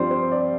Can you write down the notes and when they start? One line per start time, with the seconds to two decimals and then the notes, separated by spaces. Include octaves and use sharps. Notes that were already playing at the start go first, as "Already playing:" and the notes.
Already playing: G2 F3 C4 C5 D5
0.11 C5
0.32 D5